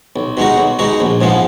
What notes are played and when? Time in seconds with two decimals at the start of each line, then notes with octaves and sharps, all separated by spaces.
0.16 B1
0.37 B2 G#3 D#4 F#4
0.58 B1
0.79 B2 G#3 D#4 F#4
1.00 A#1
1.21 G#2 F3 G#3 B3